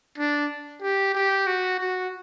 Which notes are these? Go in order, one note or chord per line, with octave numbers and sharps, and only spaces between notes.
D4
G4
G4
F#4
F#4